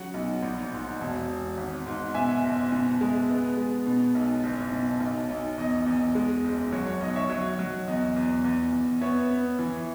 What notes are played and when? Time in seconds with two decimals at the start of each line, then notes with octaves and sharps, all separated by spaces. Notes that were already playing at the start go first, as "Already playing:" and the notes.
Already playing: C#3 F#3 F#5
0.14 B1
0.43 A#1
0.72 G#2
1.01 E1
1.29 E1
1.58 G#1
1.87 G#2
2.14 B2 E5 G#5
2.43 F#1
2.72 B2
3.01 G#3
3.30 B3
3.57 G#3
3.86 B2
4.15 B1
4.43 F#1
4.72 B2
5.00 B1
5.29 B1
5.58 E2 D#5
5.86 E2
6.15 G#3
6.44 F#1
6.72 F#3 C#5
6.87 C#5
7.01 B1 D#5
7.15 C#5 E5
7.30 F#3 C#5
7.59 F#3
7.87 E2 D#5
8.16 E2
8.44 E2
8.72 E2
9.01 B3 C#5 E5
9.31 B3
9.59 E3